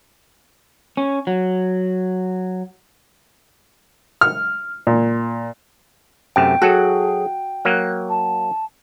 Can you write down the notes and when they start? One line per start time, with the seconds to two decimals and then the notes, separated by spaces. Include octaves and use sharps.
0.97 C#4
1.27 F#3
4.21 F6
4.87 A#2
6.36 F#2 C3 A3 G5
6.62 F#3 F#4 G#4 A4
7.65 F#3 A#3 F#6
8.09 A5